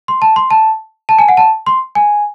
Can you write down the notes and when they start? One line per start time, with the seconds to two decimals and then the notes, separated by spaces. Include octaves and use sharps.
0.08 C6
0.22 A5
0.36 C6
0.50 A5
1.09 A5
1.19 G#5
1.29 F#5
1.37 A5
1.67 C6
1.95 G#5